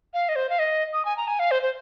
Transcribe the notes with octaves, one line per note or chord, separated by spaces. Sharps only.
F5
D#5
C5
F5
D#5
D#6
G#5
A#5
G#5
F5
C5
C5